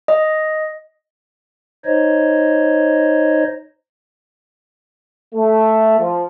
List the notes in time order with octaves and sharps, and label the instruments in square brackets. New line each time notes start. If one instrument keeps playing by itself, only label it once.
[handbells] D#5
[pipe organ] D#4 C5 C#5 D#5
[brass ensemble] A3
F3